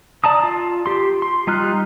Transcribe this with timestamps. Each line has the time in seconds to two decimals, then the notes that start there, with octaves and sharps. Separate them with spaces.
0.24 D5 A5 A#5 D#6
0.43 F4
0.86 G4 C6
1.22 C6
1.47 G3 D#4 F4 F6 F#6